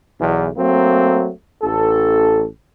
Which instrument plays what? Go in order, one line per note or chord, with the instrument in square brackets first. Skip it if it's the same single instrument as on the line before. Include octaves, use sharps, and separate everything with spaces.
[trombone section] B1 E2
F#3 A3 A#3 C4
A1 A4